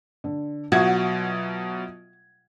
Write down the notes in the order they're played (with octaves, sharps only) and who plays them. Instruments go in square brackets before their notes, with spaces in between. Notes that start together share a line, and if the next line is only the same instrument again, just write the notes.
[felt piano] D3
[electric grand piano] B2 F#3 G#6 [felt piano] F4 E5 D#6 [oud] F#4